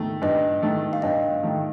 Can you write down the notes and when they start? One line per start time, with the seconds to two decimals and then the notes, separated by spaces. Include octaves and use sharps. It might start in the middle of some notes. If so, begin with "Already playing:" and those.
Already playing: D#3 A3
0.22 G2 D#5
0.62 D#3 A3
0.93 F5
1.02 G2 D#5
1.43 D#3 A3